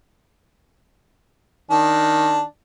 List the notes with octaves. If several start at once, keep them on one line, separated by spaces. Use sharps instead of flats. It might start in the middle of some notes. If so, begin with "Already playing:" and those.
D#3 D4